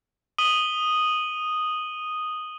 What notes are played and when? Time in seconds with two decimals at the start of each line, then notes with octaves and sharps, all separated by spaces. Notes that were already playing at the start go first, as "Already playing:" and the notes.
0.39 D#6 D#7 F#7 G7